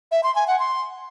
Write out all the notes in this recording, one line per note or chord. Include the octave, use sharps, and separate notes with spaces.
E5
C6
G#5
F#5
C6